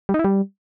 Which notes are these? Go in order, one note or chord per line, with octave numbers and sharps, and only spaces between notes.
G3
D#4
E4
G3